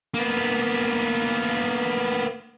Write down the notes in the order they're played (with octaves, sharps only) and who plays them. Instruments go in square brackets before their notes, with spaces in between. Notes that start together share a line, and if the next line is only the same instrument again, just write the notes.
[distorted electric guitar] A#3 B3